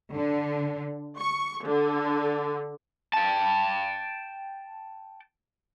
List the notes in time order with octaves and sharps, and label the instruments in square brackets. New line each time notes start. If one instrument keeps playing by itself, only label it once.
[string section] D3
C#6
D3
[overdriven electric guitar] G5 A5